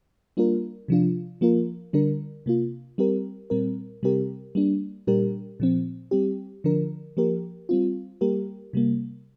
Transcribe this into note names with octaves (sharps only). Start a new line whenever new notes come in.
G3 A#3 D4 F4 A#4
C3 F3 D4 F4
F3 A#3 F4 A#4
D3 G3 D4 A#4
C3 A#3 F4
G3 C4 G4 A#4
A#2 G3 C4 A#4
C3 G3 C4 G4 A#4
G3 A#3 D4
A#2 G3 D4 G4 A#4
A#2 F3 C4
G3 C4 G4
D3 F3 D4 A#4
F3 A#3 G4 A#4
G3 C4 F4
G3 A#3 G4 A#4
C3 G3 A#3